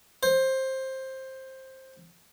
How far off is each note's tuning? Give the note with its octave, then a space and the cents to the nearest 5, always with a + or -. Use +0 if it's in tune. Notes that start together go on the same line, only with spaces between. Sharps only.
C5 +15